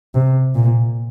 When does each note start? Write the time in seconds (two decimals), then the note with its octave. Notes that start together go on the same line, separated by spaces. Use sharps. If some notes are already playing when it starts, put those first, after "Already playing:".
0.15 C3
0.55 A#2